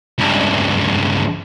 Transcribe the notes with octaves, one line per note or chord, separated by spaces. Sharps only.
C#2 G2